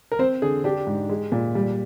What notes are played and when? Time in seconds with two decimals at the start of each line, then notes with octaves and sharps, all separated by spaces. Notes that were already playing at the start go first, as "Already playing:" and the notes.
0.12 A#4
0.19 C4 C5
0.42 D3 G#4
0.64 D4 G4
0.87 G#2
1.09 G#3
1.32 A#2
1.55 G3